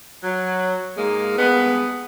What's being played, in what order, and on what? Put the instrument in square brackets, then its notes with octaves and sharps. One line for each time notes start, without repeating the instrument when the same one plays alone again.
[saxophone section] F#3
G#2 G#3 A#3
G2 G#3 B3